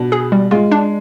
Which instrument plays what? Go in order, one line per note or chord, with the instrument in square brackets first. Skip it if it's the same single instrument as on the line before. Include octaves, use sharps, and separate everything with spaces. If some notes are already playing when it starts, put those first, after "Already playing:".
Already playing: [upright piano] B2 [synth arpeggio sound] D4
[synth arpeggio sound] G#4
G3
[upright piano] G#3 [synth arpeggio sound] F4
[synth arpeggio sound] D4